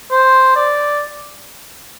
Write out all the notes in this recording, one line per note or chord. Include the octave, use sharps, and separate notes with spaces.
C5
D5